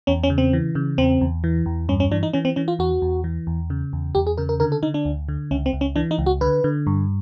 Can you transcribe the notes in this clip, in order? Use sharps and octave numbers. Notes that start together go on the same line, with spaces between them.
E2 C#4
C#4
C#3
C4
E3
C#3
E2 C4
E2
E3
E2
G2 C#4
C#4
E3 D4
D#4
E3 C#4
C4
E3 C#4
F4
E2 F#4
E2
E3
E2
C#3
E2
E2 G4
G#4
C#3 A#4
A#4
D3 A#4
A4
D3 D#4
D4
D2
D3
C#2 C#4
C4
C#2
C#4
E3 D4
D#4
C#2
F#4
D3 B4
D3
G2